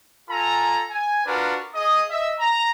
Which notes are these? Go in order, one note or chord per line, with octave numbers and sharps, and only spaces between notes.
F4 A4 G#5 A#5
G#5
D4 F4 F#4 A#4 B4
G#4 D#5 D#6
D#5 E5
A#5